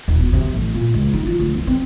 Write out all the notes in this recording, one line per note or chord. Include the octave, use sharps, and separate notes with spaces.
D#1
B2
C3
A1
A#2
C#2
D#3
F4
D2
C2
C4